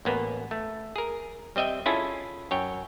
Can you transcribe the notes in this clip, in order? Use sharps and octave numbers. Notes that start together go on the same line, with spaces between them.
A1 A#3 B3
A3
G#4 A#4
G3 C4 D#5 E5 G5
C#4 E4 F4 G#4 A4
F#2 C#5 G5